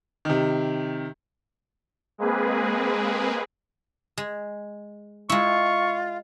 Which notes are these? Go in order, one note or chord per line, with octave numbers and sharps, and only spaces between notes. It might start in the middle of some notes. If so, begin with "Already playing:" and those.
C3 D#3
G#3 A#3 C4 G#4 B4
G#3
G#3 E4 F4 C#6